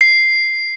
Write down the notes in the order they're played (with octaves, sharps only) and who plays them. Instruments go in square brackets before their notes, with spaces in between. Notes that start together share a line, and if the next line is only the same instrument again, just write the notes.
[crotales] C7